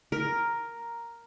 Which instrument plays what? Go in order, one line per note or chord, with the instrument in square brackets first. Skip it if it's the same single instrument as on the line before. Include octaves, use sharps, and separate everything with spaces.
[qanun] A#4